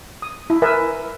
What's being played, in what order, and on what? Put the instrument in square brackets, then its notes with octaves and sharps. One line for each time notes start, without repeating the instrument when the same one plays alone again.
[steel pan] D#6
E4
A#4 B4 E5 G#5